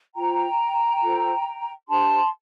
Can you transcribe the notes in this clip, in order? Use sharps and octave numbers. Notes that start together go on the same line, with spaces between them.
F4 C5 G5 A#5
F4 A4 C5
D4 G4 C5 A5 C6